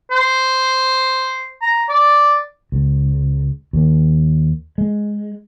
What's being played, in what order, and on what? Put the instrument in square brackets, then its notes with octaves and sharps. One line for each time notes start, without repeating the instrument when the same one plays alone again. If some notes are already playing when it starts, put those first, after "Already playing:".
[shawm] C5
A#5
D5
[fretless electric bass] C#2
D#2
G#3